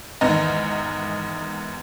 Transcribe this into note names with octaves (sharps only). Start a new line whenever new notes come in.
E2 G#2 D#3 B3 D#5 A#5